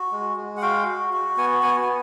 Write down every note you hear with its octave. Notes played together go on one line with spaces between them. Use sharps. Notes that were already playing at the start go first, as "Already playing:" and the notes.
Already playing: F#4
G#3
G#3
F#5
F#4 F5 G5
F#4
F#4
B3 F#5 G#5
B3 F#5 G#5
G#5